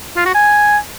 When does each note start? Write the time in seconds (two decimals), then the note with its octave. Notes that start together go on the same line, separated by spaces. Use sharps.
0.16 F4
0.25 F#4
0.35 G#5